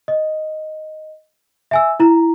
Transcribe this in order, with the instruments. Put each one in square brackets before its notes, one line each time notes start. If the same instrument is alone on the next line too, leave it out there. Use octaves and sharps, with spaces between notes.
[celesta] D#5
E5 G#5 E6
E4 A#5